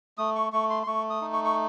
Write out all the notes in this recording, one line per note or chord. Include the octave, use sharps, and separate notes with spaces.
A3 D#6
C#6
A3 C#6
C6
C6
A3 C#6
D#6
D#4
C#6
C#6